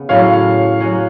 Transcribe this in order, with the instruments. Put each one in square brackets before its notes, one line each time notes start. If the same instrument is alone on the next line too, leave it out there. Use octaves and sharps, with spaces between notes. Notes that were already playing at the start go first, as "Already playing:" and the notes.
Already playing: [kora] C#3 B3
[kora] A2 F#3 C#4 [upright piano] C#5 F5
[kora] F#3 C#4 F#4